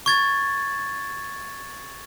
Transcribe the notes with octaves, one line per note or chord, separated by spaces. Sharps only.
C#6 G#6 A6